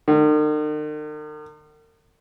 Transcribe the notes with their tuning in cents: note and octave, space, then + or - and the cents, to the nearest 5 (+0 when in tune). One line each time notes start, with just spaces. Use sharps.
D#3 -45